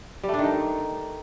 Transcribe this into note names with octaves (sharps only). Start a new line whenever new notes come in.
G3
A3
D4
D#3
D#4